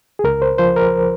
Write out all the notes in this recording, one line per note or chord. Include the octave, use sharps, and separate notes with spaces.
G#4
C#2 A#4
C5
F3 C5
A#4